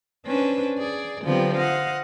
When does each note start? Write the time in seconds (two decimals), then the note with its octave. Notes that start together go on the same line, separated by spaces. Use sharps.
0.25 C#4 D4 B4 C5
0.78 G#4 D5
1.23 D3 F3 F#3 B3 C4 G4
1.57 C5 D#5 F5 F#5